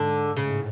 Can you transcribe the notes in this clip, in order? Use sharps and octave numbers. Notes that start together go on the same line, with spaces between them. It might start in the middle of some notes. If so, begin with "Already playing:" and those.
Already playing: G#2 D3
A2 C#3